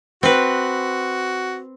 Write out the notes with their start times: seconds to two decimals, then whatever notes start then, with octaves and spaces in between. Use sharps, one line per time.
0.23 C4 F#4 B4